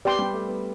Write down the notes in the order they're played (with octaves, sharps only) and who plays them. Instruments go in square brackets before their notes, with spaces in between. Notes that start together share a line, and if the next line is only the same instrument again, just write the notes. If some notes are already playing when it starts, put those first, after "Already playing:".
[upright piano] B3 [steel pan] G4 D5 G5 C6
[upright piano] G3
A3
B3